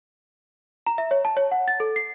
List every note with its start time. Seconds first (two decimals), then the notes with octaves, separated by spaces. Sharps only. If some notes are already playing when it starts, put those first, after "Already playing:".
0.86 A#5
0.98 E5
1.11 C#5
1.25 A5
1.37 C#5
1.51 F#5
1.68 A6
1.80 A4
1.96 C7